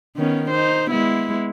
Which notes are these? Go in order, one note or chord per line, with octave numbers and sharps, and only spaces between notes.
D#3 B3 C#4
D#4 C5
G#3 B3 E4